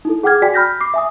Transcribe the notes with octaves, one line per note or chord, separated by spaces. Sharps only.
D#4 E4 A4
G#4 F#5 G5 D6 F6 G#6
F#4 D5 G5 G#5 B6
B5 F6 G6 A#6 B6
D6 C7
E5 G#5 D#6